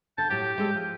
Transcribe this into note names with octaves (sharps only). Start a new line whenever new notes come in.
D3 A5 G6
A2 F#3 G4
G#3 A3 A4
F3